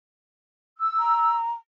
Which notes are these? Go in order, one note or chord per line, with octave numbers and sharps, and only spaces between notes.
E6
A#5